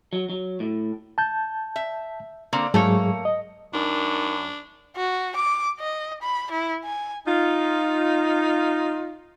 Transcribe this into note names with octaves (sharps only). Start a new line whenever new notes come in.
F#3
F#3
A2
A5 G6
E5
D3 A#3 C4
G#2 F#3 A3 A#3 G#4 C#5
D#5
F#2 D4 D#4 A#4
F#4
D6
D#5
B5
E4
G#5
D#4 F4